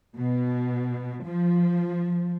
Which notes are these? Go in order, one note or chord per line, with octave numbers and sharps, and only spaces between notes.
B2
F3